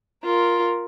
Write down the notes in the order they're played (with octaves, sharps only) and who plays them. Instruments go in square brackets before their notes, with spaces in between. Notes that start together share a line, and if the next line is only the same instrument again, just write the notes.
[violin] F4 A#4